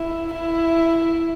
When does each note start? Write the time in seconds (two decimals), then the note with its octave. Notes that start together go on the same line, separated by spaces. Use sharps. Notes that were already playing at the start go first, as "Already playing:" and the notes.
Already playing: E4
0.34 E4